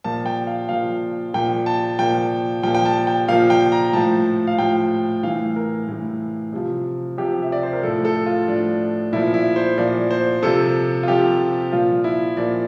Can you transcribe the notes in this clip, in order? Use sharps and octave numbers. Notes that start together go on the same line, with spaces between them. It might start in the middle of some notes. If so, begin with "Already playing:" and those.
A#2 F3 A5
G5
F5
A#2 F3 F5
A#2 F3 G5
A5
A#2 F3 G5
A#2 F3 G5
G5
A5
G5
A#2 F3 F5
G5
A#5
A2 F3 A5
F5
A2 F3 G5
A2 E3 F5
A#4
A2 E3
C3 F3
C3 F3 G4
E5
D5
C5
A#4
A2 F3 A4
A4
F4
A2 F3 D4
A#2 F3 E4
E4
C5
A#2 F3 D5
C5
C3 F3 A4
F4
C3 F3 G4
A#2 F3 F4
E4
A#2 F3 D5